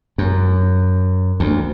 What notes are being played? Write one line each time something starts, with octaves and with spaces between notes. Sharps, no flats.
F#2
D2